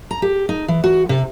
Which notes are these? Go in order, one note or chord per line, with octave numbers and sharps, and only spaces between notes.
A#5
G4
D#4
E3
F#4
C3